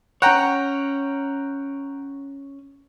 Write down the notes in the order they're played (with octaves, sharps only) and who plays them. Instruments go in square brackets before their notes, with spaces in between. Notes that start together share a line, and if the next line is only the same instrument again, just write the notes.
[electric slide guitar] C#4 C#5 [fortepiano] F#5 G5 A#5